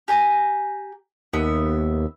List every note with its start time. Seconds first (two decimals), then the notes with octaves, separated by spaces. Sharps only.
0.08 G4 G#5 A#5
1.33 D#2 B3 E5